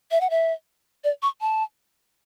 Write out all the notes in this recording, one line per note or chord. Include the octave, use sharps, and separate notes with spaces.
E5
F#5
E5
D5
C#6
A5